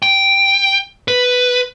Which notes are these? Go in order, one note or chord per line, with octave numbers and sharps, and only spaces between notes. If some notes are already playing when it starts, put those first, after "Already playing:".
G5
B4